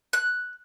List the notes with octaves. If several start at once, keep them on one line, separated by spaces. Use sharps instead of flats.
F#6